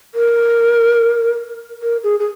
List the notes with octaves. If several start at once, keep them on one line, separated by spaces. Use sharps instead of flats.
A#4
A#4
G#4
G#4